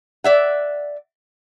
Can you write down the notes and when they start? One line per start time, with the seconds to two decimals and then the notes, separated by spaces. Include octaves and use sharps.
0.24 D5 E5 F#5